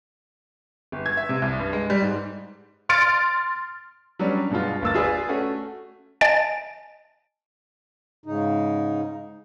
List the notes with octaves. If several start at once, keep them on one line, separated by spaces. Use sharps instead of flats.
G1
G#6
E5
C3
C2
G2
G#3
G3
G#2
C6 F6 A6 D7
F#3 G3 B3 C#4 D4
G2 B2 G#3 B3 F4
G1 A#3 E6 A6
F4 G#4 B4 D5
A3 C#4 F#4
D#5 G#5 A5 A6 D7
G#2 C#3 D#4